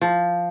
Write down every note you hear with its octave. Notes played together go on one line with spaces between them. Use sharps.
F3